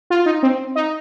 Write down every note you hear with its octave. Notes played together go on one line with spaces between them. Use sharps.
F4
D#4
C4
D#4